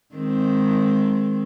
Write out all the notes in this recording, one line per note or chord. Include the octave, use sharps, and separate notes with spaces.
D#3 G#3 C4